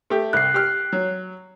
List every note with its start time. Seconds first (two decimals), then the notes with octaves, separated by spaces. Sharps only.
0.10 A3 G4
0.33 C2 F#6 C7
0.54 G4 F6
0.92 F#3